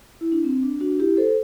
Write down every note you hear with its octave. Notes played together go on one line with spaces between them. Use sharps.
E4
D4
C4
D4
D4 F#4
E4 G4
A4 C5